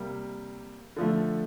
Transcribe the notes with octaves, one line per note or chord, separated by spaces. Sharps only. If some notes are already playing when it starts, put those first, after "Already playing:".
Already playing: C3 G3 A#3
D3 F3 A3